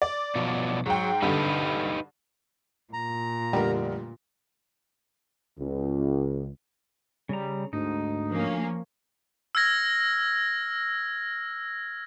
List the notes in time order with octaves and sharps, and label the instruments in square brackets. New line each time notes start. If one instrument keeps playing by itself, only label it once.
[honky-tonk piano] D5
[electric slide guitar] B2 F3 F#3
[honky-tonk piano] G#2 G5 [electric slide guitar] F#3
[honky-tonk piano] G2 D3 [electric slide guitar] D#4 G4 B4
[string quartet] A#2 [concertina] A#5
[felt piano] F1 D3 A#4 [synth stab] G3
[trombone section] C#2
[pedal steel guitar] C#3 A#5 [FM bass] G3
[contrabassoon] D2 [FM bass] G#2 [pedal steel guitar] D#4
[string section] F3 A#3 C#4
[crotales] E6 F6 G#6 A#6